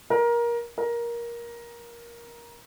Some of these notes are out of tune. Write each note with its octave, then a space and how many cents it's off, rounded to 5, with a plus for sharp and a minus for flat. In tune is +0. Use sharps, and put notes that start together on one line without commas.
A#4 +20
A#4 +15